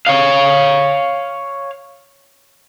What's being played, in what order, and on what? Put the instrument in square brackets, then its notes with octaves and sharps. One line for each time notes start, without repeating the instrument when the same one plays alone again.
[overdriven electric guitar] C#5 F5